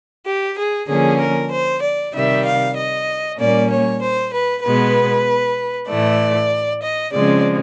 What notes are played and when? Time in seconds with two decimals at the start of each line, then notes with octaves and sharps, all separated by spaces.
0.26 G4
0.58 G#4
0.88 D3 F3 A#3 C#4 G#4
1.20 A#4
1.51 C5
1.82 D5
2.14 C3 D#3 G3 E5
2.46 F5
2.76 D#5
3.38 A#2 G3 A#3 C#4 D5
3.69 C#5
4.01 C5
4.32 B4
4.64 B2 G#3 B3 B4
5.89 A2 E3 A3 D5
6.83 D#5
7.13 C#3 F3 G#3 C4 D5